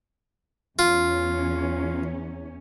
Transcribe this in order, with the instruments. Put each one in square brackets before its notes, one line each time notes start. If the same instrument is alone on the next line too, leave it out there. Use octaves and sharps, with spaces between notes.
[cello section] E2 C#4 [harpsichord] F4